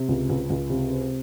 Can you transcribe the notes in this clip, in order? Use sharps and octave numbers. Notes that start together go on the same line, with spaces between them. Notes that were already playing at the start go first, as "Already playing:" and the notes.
Already playing: C3
C#2
C#2
C#2
C3
C4